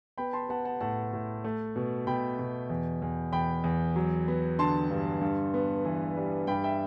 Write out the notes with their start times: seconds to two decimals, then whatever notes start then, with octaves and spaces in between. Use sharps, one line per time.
0.18 B3 G5 B5
0.33 A5 C6
0.49 B3 F#5 A5
0.65 F#5 A5
0.81 A2 F#5 A5
1.13 A2
1.44 A3
1.76 B2
2.07 B2 G5 B5
2.39 B2
2.70 E2
3.02 E2
3.32 E2 G5 B5
3.64 E2
3.96 F#3
4.28 B3
4.59 D3 A5 C6
4.90 G2
5.22 G2
5.54 B3
5.85 E3
6.17 G3
6.47 G2 G5 B5
6.64 E5 G5